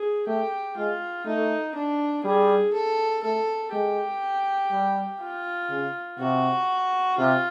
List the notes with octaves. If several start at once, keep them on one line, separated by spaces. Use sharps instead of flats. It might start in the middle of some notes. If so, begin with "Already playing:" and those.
Already playing: G#4
A3 G4
G#3 F4
A3 D#4
D4
G3 G#4
A4
A3 A4
G#3 G4
G3
F4
C#3
C3 F#4
C3 F4